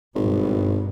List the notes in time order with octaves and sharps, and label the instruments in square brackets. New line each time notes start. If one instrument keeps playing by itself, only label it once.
[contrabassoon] G#1 [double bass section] G2 B2